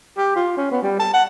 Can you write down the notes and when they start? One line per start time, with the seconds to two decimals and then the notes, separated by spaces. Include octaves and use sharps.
0.17 G4
0.36 F4
0.57 C#4
0.71 B3
0.83 G3
1.00 A5
1.14 F#5